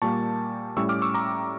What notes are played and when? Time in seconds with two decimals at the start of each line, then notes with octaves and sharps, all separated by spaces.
0.02 A#2 G3 A#3 A5 C#6
0.77 A2 G3 C#4 C#6 E6
0.89 D6 F6
1.02 C#6 E6
1.14 A#5 D6